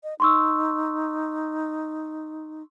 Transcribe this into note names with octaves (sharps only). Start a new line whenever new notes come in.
D#5
D#4 C6 C#6 E6